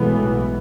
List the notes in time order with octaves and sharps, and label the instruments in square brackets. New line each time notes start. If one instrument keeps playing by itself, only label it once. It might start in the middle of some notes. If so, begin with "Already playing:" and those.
Already playing: [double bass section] B1 A2 E3 B3 [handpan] G#3